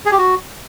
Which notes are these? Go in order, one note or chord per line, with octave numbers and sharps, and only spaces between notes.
G#4
G4
F#4